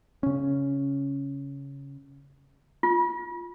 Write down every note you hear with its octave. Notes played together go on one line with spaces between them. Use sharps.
C#3 C#4
F4